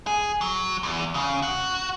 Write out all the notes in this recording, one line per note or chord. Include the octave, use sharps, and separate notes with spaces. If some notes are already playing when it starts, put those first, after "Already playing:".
G#4
F#3
E2
C#3
F#4